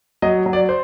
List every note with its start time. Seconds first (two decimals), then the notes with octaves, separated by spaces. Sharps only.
0.22 F#3 D#5
0.46 F#3
0.53 D5
0.69 C5